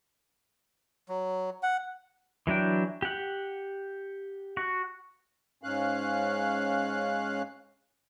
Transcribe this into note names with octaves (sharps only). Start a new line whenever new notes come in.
F#3
F#5
E3 F#3 D4 G5
G4 F#5
F#4
G#2 C#4 F5 F#6